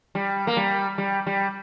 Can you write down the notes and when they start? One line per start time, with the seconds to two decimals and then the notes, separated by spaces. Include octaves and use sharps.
0.15 G3
0.47 A#3
0.57 G3
0.98 G3
1.27 G3